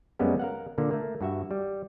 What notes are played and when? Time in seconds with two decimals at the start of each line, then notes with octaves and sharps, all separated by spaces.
0.19 F#2 G3 G#3 A#3 B3 C#4
0.39 A#4 F5 F#5
0.78 A#2 D3 A#3
0.91 A3 A#3
1.21 G2 F#4 E5
1.51 G3